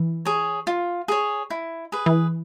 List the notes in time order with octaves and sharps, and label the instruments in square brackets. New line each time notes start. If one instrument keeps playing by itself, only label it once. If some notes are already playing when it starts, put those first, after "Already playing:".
Already playing: [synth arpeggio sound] E3
[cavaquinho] G#4 C#5
F4
G#4 C#5
E4
G#4 B4
[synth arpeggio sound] E3